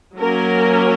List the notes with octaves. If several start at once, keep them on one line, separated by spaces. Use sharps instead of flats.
F#3 A#3 C#4 A#4